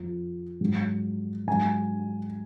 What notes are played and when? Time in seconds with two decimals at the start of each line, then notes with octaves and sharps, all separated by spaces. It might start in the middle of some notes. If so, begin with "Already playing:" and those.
Already playing: F2 F3
0.61 G#2 F#3
1.47 G#2 F#3 G#5